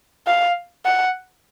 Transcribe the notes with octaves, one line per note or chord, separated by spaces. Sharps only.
F5
F#5